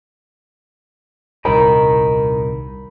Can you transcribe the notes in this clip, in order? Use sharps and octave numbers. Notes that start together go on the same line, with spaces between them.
D#1 C2 D#4 A#4 B5